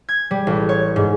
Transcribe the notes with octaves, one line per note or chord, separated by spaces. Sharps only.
G#6
G3
A1
C#5
G#2